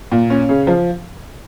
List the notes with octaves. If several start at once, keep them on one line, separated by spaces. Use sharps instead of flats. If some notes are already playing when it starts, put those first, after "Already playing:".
A#2
C#4
C#3
F3